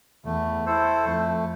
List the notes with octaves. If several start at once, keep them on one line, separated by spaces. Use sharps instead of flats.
E2 A3
E4 A4 C5
F2 A3